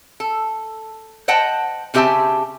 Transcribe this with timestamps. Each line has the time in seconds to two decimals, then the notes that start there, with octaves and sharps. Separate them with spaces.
0.20 A4
1.28 C5 D#5 F#5 G5 A5
1.94 C#3 C4 G4 E5 G#5 A5